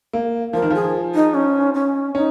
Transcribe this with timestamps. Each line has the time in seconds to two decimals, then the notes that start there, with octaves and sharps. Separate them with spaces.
0.13 A#3
0.53 F3 A#4
0.62 D#3
0.70 F3 G#4
1.15 D#4
1.34 C#4
1.74 C#4
2.15 C#4 D#4